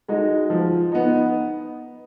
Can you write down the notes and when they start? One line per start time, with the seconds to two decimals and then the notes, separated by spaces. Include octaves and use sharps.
0.08 G#3 D#4 F#4
0.50 F3
0.92 B3 D#4